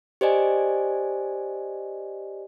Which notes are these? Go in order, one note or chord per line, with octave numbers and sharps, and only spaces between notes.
G4 C5 D5 D#5 G#5